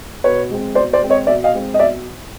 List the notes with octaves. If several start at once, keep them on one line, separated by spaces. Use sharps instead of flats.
B2 B4 C#5
G#3 C4
B2 C5 D5
C5 D5
G#3 C4
C#5 D#5
B2 D5 E5
D#5 F5
G#3 C4
D#5
B2 D5 E5